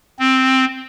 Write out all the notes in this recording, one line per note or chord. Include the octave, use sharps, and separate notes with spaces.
C4